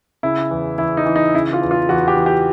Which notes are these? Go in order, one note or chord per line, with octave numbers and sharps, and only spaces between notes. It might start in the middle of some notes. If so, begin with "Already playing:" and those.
C#3 E4
E2
E2 E4
D#4
E3
D#4
C#3 E4
F4
E2
F4
E2 F#4
G4
E3
G4